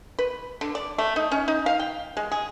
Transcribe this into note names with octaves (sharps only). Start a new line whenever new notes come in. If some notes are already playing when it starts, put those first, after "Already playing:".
B4
D3
D5
A3
D#4
C#4
D#4
F5
G5
G#3
G#4